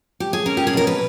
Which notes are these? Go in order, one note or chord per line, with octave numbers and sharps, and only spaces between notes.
G4
G#4
C#4 A#4
G4
G#4
B2 A#4
B4